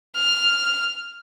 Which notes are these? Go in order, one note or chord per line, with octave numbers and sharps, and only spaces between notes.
F6